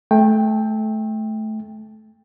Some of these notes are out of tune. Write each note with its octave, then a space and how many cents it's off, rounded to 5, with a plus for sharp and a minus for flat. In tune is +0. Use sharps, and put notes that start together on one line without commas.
A3 -20 G5 +15